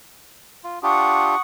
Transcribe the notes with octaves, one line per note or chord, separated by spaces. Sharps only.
F4
D4 F4 G4 F#5 C#6 D#6